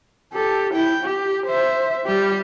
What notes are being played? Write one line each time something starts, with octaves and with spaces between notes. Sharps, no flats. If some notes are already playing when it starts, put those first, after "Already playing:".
G4 A4
E4 G5
G4
C5 E5
G3 G4